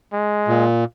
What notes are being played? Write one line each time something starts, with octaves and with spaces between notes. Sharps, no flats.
G#3
A#2